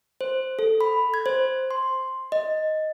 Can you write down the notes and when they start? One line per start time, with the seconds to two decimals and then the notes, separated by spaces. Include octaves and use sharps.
0.21 C5
0.59 A4
0.81 B5
1.14 G#6
1.26 C5
1.71 C6
2.32 D#5